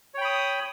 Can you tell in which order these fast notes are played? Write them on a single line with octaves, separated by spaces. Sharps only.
C#5 G5 B5 D#6